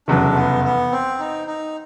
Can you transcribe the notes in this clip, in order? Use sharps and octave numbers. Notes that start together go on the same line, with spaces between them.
F1 E2 C#3 F#3 D4
B3
B3
C4
D#4
D#4